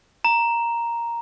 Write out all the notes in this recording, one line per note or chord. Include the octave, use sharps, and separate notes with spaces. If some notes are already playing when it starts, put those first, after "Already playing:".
A#5